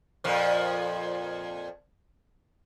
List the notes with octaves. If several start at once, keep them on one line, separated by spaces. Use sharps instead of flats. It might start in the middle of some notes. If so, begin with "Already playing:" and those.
F2 A#2 F3